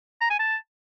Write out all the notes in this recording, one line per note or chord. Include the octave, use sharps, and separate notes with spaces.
A#5
G#5
A5